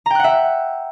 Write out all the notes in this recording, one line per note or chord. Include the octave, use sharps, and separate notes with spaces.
E5 F#5 G5 A#5 F#6